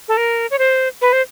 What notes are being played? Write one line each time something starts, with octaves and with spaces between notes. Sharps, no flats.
A4
A#4
C#5
C5
B4
C5